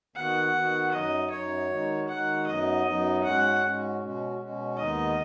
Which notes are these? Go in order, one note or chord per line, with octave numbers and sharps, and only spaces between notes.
D#3 B3 F#4 F#5
D#3 B3 F#4
F#2 F#3 D#4 D#5
F#2 F#3 D#4 C#5
D#3 G#3 D#4 F#4
D#3 G#3 D#4 F#4 F#5
F#2 F#3 B3 D#4 D#5
F#2 F#3 B3 D#4
G#2 G#3 C#4 F#4 F#5
G#2 G#3 C#4 F#4
B2 G#3 C#4 F#4
B2 G#3 C#4 F#4
D#2 D#3 G#3 B3 D#4 D#5